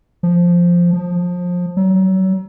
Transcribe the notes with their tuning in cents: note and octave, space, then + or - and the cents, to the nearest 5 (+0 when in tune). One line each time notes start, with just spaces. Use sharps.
F3 +0
F3 +25
F#3 +35